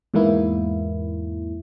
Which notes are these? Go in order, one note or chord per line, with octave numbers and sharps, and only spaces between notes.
E2 G#2 E3 A#3 E4